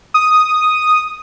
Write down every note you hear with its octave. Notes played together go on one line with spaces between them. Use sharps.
D#6